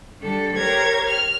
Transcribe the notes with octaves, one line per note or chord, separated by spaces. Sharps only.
D3 G3 A4
G4 A#4 C5 C#5 G#6 A#6
F6